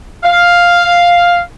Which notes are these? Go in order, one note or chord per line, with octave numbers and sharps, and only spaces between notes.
F5